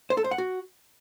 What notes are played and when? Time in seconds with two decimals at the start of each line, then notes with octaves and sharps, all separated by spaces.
0.10 C5
0.17 A4
0.24 C5
0.31 F#5
0.38 F#4